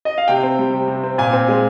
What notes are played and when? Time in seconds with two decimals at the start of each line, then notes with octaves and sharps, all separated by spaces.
0.05 D#5
0.18 F5
0.28 C3 G5
0.43 C4
0.58 G3
0.74 C3
0.88 C3
1.03 C4
1.18 A#2 G#5
1.33 C4
1.49 G#3